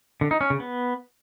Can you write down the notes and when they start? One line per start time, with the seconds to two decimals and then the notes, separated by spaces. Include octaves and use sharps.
0.21 D3
0.31 D#4
0.41 C#4
0.50 C#3
0.60 B3